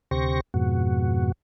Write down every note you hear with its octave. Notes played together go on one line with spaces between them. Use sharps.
D2 C3 G4 C5 C#6 A#6
F2 G#2 B2 F#4